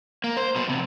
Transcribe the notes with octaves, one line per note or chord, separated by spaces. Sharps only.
A#3
C5
B2 F#3
F2 C3